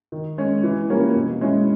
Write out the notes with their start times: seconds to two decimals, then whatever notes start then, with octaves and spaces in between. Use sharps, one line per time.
0.12 D#3
0.38 G#3 C#4
0.63 E3
0.90 G3 A#3 C#4 F4
1.16 B2
1.41 G#3 C#4 E4